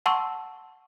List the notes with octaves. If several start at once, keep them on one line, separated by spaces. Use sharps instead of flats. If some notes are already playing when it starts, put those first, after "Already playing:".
F#5 A5 C6 C#6 E6